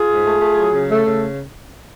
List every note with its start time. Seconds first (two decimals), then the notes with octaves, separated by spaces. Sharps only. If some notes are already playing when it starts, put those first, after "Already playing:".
Already playing: F4 G#4
0.08 G#2
0.24 A3
0.40 A3
0.57 F#3
0.73 C#3
0.90 A3
1.06 C#3